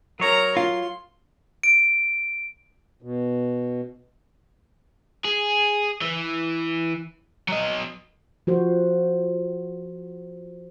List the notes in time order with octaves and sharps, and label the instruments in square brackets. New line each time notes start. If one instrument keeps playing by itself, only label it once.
[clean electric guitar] F#3 C#5 [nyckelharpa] A#4 A#5
[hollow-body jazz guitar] F4 [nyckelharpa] C6
[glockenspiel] D7
[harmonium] B2
[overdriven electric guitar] G#4
E3
F#3 D#5
[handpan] F3 F#4 C5